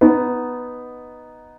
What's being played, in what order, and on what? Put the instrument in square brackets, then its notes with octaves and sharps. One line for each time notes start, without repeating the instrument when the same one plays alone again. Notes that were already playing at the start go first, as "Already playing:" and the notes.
[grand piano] B3 D#4